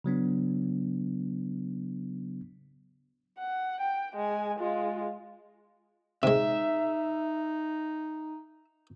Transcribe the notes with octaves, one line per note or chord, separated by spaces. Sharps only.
C#3 F#3 B3 D4
F#5
G5
G#3 G#5
G#3 F4
C3 G#3 D#4 E5